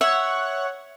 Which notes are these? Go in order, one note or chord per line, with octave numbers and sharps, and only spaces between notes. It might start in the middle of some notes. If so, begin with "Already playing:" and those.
C#5 E5 F#5